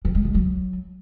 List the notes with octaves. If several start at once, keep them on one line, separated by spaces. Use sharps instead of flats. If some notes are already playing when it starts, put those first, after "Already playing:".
F3
G#3
D3
F#3